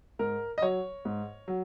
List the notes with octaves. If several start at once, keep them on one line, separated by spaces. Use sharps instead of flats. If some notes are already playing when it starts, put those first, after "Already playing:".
G#2 A#4
D#5
F#3 C#5
G#2
F#3